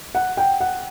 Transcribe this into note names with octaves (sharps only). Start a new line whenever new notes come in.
F#5
G5
F#5